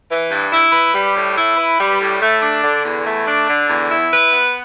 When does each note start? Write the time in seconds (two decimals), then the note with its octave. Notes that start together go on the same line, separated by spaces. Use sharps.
0.10 E3
0.30 G2
0.53 E4
0.73 B4
0.94 G3
1.16 A2
1.37 E4
1.57 B4
1.78 G3
2.00 A2
2.20 A3
2.42 D4
2.63 D3
2.84 E2
3.05 A3
3.27 D4
3.48 D3
3.69 E2
3.91 E4
4.11 B4
4.33 B3